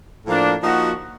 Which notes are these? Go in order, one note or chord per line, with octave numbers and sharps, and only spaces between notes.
A2 F3 A#3 D4
F3 A#3 D#4 F#4